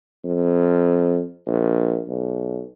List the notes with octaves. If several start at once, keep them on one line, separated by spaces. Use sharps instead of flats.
F2
A#1
B1